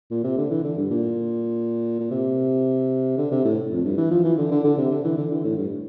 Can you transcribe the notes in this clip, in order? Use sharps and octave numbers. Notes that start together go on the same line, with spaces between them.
A#2
C3
D3
E3
D3
G2
A#2
A#2
C3
D3
C3
A2
F2
G2
E3
F3
E3
D3
D3
D3
C3
D3
E3
D3
E3
A2
G2